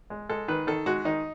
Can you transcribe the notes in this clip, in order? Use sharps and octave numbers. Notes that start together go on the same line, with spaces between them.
G#3
G#3 A4
D#3 B4
D#3 A4
G#3 F#4
D#3 D#4